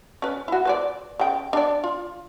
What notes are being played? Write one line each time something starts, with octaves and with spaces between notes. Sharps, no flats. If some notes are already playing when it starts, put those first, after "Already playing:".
C#4 B4
E4 F#4
B4 C5 D5
C#3 G5
D4 D5
F4